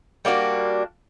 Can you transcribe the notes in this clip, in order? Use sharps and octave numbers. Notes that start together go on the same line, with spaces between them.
G3 A#3 D4 F#4